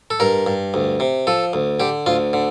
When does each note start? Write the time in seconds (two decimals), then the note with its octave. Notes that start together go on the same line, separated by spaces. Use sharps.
0.10 A4
0.20 G2 A#4
0.46 G2
0.74 D2
1.00 C3
1.27 F3 A4
1.53 D2
1.80 D3 G4
2.06 D2 F4
2.33 D3